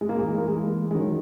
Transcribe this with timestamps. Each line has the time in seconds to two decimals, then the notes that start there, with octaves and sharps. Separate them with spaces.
0.01 G#3
0.09 A#3
0.19 E3 G#3
0.38 A#3
0.47 E3 G#3
0.91 G#3
0.95 D#3 F#3